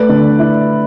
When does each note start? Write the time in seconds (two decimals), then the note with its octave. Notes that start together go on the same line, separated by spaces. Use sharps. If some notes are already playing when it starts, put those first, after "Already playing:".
Already playing: A3 B4 D5
0.09 D3
0.39 E4